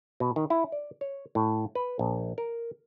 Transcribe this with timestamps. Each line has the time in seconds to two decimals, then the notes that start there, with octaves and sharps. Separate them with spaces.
0.20 B2
0.36 D#3
0.50 E4
0.72 D5
1.01 C#5
1.35 A2
1.75 B4
1.99 A#1
2.38 A#4